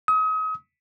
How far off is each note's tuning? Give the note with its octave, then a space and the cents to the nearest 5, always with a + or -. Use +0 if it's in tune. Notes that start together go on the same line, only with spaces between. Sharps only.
D#6 +35